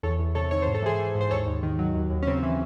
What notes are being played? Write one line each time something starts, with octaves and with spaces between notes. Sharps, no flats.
E2 A4 C#5
E2
C3 A4 C#5
D#3 C#5
G#2 C5
A4
E3 G#4 C5
E3
G#2
C5
D#2 A4 C#5
D#2
D#3
F#3
D#2
D#2
C#4
C#3 C4
E3